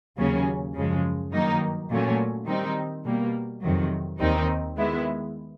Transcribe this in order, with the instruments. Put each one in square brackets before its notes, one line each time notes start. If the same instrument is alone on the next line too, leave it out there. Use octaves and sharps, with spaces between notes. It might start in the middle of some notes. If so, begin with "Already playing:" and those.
[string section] D#2 C#3 F#3 A#3 C#4
F#2 C#3 F3 G#3
G2 D#3 F#3 A#3 D#4
A#2 F#3 A3 C#4
D#3 G3 C4 D#4
B2 G3 A#3
F2 C3 D#3 F#3
D#2 D#3 G3 C4 D#4
D#3 G#3 B3 E4